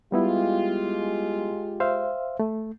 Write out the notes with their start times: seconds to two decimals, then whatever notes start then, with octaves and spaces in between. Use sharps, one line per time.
0.12 G3 G#3 B3 E4 F4 G4
1.80 C5 E5 F5
2.40 A3